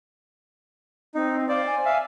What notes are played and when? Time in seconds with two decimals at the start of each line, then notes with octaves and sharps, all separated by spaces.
1.15 C4 D#4
1.49 C5 D5 F5
1.66 G#5
1.85 E5 F5